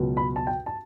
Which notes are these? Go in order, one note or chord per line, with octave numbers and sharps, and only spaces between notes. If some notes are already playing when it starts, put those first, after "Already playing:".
Already playing: C#2 B2 F#3
B5
A5
G5
A5